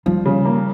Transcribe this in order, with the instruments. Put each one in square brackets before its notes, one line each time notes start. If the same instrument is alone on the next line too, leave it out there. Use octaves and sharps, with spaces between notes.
[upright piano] F3 [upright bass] G3
[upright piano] C#3
A#3